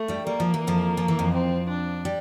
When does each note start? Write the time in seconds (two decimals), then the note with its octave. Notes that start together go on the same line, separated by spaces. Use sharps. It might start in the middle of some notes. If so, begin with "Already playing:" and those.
Already playing: A3
0.08 G2 G3
0.26 G3 A#3
0.40 F3
0.54 E3
0.67 F2 F3
0.97 F3
1.08 E3
1.19 F2 F3
1.33 C4
1.69 D4
2.05 G3